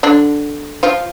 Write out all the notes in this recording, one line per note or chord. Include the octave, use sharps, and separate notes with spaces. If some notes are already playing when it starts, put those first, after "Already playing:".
D3 D4
F3 F4